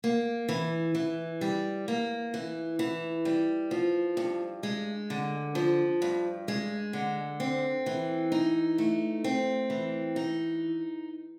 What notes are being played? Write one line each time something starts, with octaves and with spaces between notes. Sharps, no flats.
A#3
E3
E3
G3
A#3
E3
E3
G3
F3
G2
G#3
D3
F3
G2
G#3
D3
C4
E3
D#4
A3
C4
E3
D#4